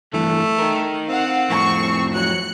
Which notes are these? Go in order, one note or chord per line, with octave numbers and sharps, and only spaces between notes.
G2 E3 A3
D#4 A#4
C4 F5 F#5
F2 A2 C#6
F#3 F#6 C#7